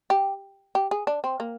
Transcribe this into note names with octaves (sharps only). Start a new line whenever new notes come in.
G4
G4
G#4
D4
C4
A#3